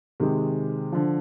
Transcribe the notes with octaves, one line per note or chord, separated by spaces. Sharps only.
C3 D#3 G#3
D3 F3